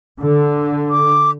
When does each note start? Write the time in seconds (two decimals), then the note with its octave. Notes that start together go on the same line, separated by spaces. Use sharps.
0.21 D3
0.90 D6